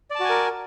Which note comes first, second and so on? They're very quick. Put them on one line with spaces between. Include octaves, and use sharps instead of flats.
D5 A5 F#4 G#5 A#4